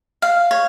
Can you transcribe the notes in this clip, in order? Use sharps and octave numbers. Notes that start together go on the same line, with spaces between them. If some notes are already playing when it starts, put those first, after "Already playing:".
F5
C#5